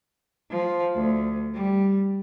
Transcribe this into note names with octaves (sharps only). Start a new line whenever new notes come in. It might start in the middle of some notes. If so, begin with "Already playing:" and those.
F3
D2
G3